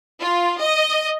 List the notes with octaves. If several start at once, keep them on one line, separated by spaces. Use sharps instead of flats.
F4
D#5